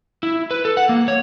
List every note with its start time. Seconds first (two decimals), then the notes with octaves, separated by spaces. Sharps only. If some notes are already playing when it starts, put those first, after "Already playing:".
0.23 E4
0.51 B4
0.65 A4
0.77 F#5
0.89 A#3
1.08 C#5